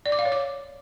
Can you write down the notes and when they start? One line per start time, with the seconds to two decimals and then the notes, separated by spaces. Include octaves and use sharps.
0.06 D5
0.12 D6
0.19 F5
0.25 C#5
0.32 D6